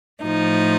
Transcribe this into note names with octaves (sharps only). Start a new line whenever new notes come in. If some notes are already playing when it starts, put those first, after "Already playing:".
A2 F3 D#4